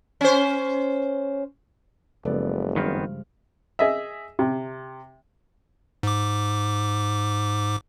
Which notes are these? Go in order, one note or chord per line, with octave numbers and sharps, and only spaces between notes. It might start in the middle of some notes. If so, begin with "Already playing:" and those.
C#4 C5
F#1 C#3 F3 G#3 B3 A4 D5
G2 D#3 B3 C4 F6
G#4 D#5 E5
C3
G#2 D6